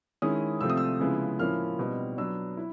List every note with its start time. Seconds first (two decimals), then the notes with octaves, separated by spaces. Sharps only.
0.22 D#3 G#3 C#4 E4 D#6
0.61 C3 F3 A3 C4 E6
0.70 D#6
0.77 E6
1.00 C#3 F3 G#3 B3 E4
1.39 A2 F3 A#3 C#4 E4 F6
1.79 B2 G3 C4 D#4
2.18 F#3 B3 D4 E6
2.57 E4